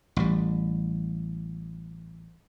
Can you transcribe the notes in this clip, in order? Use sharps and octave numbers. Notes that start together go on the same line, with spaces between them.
A1 G3